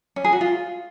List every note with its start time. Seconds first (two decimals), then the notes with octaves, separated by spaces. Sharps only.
0.16 C#4
0.24 G#4
0.33 F#4
0.41 F4